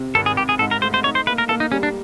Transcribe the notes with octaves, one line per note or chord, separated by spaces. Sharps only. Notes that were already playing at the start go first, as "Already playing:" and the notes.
Already playing: C3
G#1 A4
G#4
G#1 G4
G#4
G#2 A4
A#4
A3 C5
C5
D#4 C#5
C5
A#3 B4
A#4
A#3 A4
D#4
G3 C#4
D4